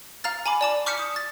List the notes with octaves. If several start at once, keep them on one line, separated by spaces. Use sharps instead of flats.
F5 A#5 F6 A6
G#5 A#5 B5 D6
D5 A5 D6
C#6 D6 F6 G6 B6 C#7
D6 D#6
A6